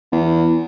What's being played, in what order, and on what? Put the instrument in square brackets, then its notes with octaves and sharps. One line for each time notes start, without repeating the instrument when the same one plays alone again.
[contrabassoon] E2